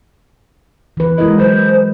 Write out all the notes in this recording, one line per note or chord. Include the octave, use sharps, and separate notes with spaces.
E3 B4
G#3 E4 A#4 D#5
F#3 B4 C5